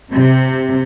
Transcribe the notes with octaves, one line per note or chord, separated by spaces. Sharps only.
C3